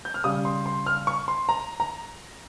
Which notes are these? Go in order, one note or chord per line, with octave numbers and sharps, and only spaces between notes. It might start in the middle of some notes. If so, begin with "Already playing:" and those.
G6
F6
C#3 G3 D#6
C6
C6
F6
C#6
C6
A#5
A#5